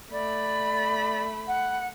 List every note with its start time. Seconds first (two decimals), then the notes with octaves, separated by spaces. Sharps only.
0.11 A3 D5 B5
1.47 F#5